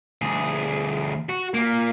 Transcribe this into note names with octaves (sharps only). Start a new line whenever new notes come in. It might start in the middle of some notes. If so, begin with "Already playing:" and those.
D2 G#4
F#4
A#3 F4